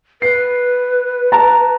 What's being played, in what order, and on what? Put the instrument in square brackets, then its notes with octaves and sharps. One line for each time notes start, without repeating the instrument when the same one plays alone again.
[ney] B4 [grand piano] C7
[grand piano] A5 A#5